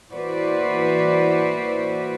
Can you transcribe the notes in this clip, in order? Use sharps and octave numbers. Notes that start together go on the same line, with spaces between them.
E3 A#3 F#4 B4 C5 D5